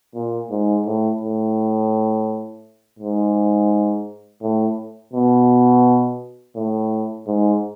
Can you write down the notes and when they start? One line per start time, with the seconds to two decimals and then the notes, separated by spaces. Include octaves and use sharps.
0.15 A#2
0.50 G#2
0.86 A2
1.21 A2
2.99 G#2
4.42 A2
5.13 B2
6.55 A2
7.27 G#2